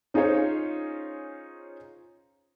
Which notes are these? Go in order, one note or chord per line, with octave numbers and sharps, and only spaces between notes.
C#4 D#4 F4 G#4 C5 C#5